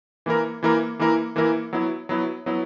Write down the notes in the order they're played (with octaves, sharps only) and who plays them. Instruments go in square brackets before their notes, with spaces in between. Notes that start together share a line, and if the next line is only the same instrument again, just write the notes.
[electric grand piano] E3 A#3 E4 A#4
E3 A#3 E4 A#4
E3 A#3 E4 A#4
E3 A#3 E4 A#4
F#3 B3 E4
F#3 B3 E4
F#3 B3 E4